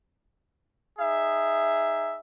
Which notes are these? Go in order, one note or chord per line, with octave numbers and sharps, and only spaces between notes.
D#4 G#4 E5